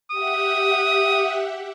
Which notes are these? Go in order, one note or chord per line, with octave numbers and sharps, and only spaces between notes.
G4 E5 F#5 D#6